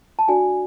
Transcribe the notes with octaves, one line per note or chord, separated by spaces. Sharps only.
A5
D4 F#4 A4 D5 G#5